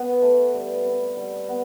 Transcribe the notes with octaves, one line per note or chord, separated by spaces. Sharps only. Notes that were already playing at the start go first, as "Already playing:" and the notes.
Already playing: B3 B4
A3
G3
C4
G3
B3